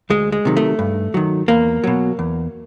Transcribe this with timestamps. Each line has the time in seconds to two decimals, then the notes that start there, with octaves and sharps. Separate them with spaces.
0.10 D2 G#3
0.32 G#3
0.45 C3 D#3 F#3
0.57 A3
0.79 G2
1.14 D#3 F#3
1.48 E2 A#3
1.84 B2 F#3
2.19 E2